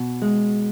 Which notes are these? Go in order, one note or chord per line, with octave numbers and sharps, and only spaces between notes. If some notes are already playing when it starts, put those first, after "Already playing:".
Already playing: B2
G#3